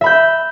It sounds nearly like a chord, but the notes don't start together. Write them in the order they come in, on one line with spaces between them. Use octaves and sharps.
E5 B5 G6